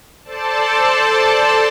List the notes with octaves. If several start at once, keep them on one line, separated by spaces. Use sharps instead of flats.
A4 C5 D5 A5